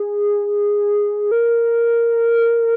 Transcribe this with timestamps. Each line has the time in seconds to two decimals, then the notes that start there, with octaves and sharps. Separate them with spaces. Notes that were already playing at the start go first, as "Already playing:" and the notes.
Already playing: G#4
1.31 A#4